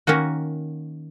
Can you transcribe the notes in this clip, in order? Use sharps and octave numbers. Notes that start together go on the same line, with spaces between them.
D#3 A#3 C#4 F#4